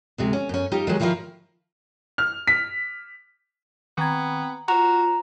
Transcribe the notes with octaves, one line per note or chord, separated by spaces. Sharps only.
D2 C3 G#3
C#4
F#2 C#4
G3 D#4 F4 G4
D#3 F#3 G#3
D#3 F3 E4 F4 A#4
F6
B6
D#3 B3 C4 G5 A#5 G#6
F4 F#4 C5 A#5 F7